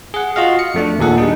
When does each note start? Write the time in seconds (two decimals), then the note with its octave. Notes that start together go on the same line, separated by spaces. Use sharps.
0.14 G#4 F#5
0.36 F4 F#4 D#5 F5
0.59 C#7
0.74 F2 A3 D4
0.99 D#2 A#2 G#4 A4 F#5
1.18 G3 D4 D#4